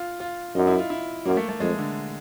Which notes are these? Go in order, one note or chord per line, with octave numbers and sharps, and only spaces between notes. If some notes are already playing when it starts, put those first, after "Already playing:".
Already playing: F4
F4
F#2 D#4
E4
F4
E4
F#2 A#3
A3
A3
F2 G#3
D3